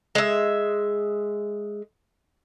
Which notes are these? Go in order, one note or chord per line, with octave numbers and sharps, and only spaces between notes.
G#3 E5